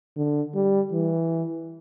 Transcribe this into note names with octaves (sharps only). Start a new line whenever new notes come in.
D3
G3
E3